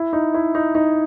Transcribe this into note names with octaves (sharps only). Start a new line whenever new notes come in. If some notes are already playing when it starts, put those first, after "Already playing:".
Already playing: E4
D#4
E4
D#4
D#4